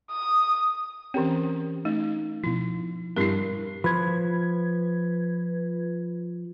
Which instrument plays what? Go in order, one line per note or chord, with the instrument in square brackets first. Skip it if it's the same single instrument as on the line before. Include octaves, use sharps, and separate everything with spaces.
[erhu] D#6
[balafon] E3 C4 [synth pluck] C#4 G4 A#4
[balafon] A3 [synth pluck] D#4
[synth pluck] B2 F3 [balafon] E4
[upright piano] G2 C7 [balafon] E4 A#4
[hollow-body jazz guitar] F3 [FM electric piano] B4 G#6